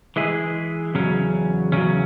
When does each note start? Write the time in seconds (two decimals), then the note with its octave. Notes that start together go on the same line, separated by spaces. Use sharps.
0.16 E3 G#3 E4 G#4
0.94 E2 C#3 F#3 C#4
1.72 E2 C#3 F#3 C#4